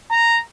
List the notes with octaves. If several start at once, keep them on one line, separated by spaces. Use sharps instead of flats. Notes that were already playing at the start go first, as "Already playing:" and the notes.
A#5